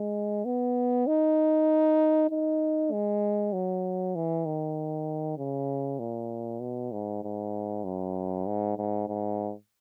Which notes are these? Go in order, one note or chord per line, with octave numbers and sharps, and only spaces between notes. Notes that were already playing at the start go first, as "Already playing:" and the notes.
Already playing: G#3
B3
D#4
D#4
G#3
F#3
E3
D#3
C#3
A#2
B2
G#2
G#2
F#2
G#2
G#2
G#2